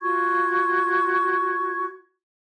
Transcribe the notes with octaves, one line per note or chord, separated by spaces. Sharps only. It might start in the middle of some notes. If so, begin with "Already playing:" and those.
F4 F#4 C#6 G#6